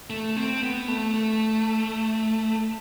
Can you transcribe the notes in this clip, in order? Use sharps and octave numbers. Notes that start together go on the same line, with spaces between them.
A3
C4
B3
A3
A3